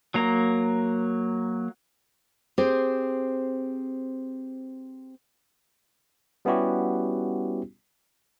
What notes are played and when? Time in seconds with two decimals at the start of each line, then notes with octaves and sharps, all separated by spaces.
0.14 F#3 A#3 A#5
2.58 C4 G4 G#4 C5
6.45 G3 B3 C#4 E4 F#4 G4